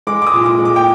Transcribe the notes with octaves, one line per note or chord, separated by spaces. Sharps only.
G#3 D6
D6
D#6
A#2
D6
G#3
D6
G5